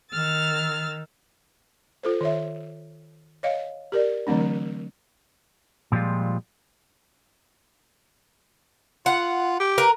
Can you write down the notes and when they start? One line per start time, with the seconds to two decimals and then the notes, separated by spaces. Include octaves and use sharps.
0.11 D#3 E6 F6 A6
2.03 F4 A4 C5
2.21 D#3 C#5 E5
3.43 C#5 D#5 F5
3.92 G4 A#4 D5
4.27 D3 E3 F#3 A3 C4 D4
5.92 A#2 F3 G3 G#3 F4
9.06 F4 F#5
9.60 G4
9.78 A#4 B4